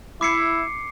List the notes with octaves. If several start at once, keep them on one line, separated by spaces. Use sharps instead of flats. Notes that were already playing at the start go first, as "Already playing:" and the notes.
E4 D6 C7 C#7